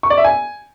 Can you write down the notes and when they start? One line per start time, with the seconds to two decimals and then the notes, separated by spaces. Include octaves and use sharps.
0.03 C#6
0.10 D5
0.17 E5
0.24 G#5